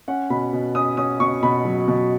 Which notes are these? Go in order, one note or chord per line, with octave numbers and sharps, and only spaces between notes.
C#4 F#5
B2 B5
B2
C#4 D#6
C#4 D#6
B2 C#6
B2 B5
F#3
B2